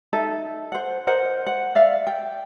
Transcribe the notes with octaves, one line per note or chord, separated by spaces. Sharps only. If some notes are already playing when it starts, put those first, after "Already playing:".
D#4 A4 E5
C5 F#5
A#4 C5 D#5 F#5
F#5
D5 E5 F5
G5